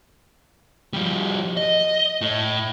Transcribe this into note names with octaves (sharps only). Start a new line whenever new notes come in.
F3 G3
D#5
A2